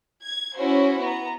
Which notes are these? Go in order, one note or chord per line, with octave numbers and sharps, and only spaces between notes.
G#6
C#4 E4 F#4 C5
B3 A#5